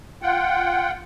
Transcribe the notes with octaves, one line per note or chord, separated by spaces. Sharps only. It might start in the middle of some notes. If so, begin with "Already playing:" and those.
F4 F#5 G5